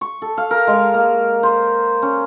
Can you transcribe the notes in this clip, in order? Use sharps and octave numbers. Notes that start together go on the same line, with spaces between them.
C#6
A4
F5
A#4
G#3
A#3
C5
C#4